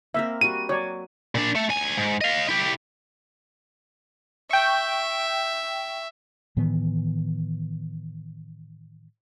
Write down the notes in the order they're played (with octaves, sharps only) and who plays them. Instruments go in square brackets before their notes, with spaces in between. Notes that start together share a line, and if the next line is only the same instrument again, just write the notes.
[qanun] A#3 C4 A#4 [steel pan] E5
[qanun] G3 F#4 [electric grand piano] D#7
[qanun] F#3 [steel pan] C#5 D5
[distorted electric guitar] A#2 D4
A3
D2 G#5
G#2
D#5 F5
E4 G4
[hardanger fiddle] E5 [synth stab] G5 C#6
[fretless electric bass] A2 D#3 E3 B3